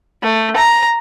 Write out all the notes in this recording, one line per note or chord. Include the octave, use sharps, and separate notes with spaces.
A3
A#5